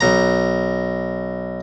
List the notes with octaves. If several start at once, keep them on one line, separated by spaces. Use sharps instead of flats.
B1 A#5